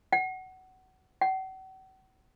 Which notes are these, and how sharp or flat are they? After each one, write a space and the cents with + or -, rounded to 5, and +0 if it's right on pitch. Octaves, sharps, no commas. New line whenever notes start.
F#5 +20
F#5 +45